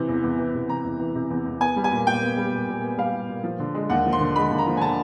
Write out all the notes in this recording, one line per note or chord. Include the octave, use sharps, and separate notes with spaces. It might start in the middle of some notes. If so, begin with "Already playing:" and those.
Already playing: C3 E3
E2
E2
E3
C3
E2 A#5
E2
E3
C3
E2
E2
B3 G#5
G3
G#5
A#2
A#2 G5
B3
G3
A#2
A#2
B3
G3 F5
A#2
A#2
F3
D3
G#3
D#2 F#5
F3
C6
D3
G#3 B5
D#2
A#5
F3
G#5
D3 A5